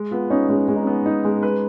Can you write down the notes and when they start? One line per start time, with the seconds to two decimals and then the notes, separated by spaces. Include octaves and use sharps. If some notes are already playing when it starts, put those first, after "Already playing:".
Already playing: G#3
0.11 B3 F4
0.30 C#4 D#4
0.49 G#3 C#4
0.68 G#3 C#4
0.76 D#4
0.83 B3 C#4
1.06 D#4
1.25 G#3
1.43 B4